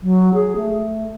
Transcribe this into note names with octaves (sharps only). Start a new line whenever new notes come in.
F#3
G#4
A3